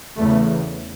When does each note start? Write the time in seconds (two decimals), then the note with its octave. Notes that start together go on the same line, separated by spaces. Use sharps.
0.17 E2 C#3 A3